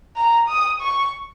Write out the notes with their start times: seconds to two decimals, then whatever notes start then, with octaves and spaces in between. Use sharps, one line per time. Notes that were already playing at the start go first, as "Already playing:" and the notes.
0.16 A#5
0.48 D#6
0.81 C#6